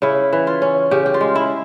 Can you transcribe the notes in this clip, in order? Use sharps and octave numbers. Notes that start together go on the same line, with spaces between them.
C#3 E4
E3
F4
C#4
C#3 G4
G4
F4
G#3
E4